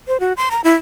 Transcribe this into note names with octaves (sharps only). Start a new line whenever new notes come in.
C5
F#4
C6
A#5
E4